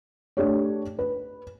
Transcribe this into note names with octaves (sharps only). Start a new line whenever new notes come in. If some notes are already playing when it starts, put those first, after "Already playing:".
A3 D4 G4 C#5
B4